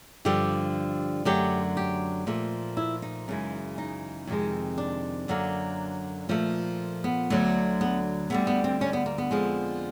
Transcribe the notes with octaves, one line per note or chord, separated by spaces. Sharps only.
G2 D3 F3 G4
F#2 D3 F#3 A3 G4
G4
A#2 F3 A3
E4
D#4
F#2 C#3 E3 G#3
D#4
F2 C3 D#3 G#3
D4
F#2 D3 F#3 A#3
A#2 F3 A3
B3
D2 D3 F#3
B3
D2 D3 G3 B3
B3
C4
C#4
B3
A#3
B3
F2 D3 F3 G#3